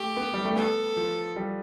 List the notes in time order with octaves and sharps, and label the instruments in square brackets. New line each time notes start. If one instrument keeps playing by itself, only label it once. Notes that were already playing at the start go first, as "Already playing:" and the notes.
Already playing: [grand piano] A3 [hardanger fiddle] G4
[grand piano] B3
G3
A3
[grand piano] B3 [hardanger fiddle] A4
[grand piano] F3
G3